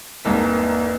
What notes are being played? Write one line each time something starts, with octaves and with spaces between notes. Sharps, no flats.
E1 C2 G#2 A#3 B4 D#5 A5